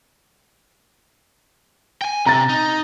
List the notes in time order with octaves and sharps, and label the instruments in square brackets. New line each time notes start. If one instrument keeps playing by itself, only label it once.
[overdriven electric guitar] G5 G#5
[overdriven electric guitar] C3 [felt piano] A#5 A6
[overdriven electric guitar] D#4